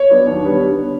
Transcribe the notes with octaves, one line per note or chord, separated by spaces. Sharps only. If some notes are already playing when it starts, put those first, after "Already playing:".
Already playing: C#5
F#3 B3 D4
D#2
D3 G3 B3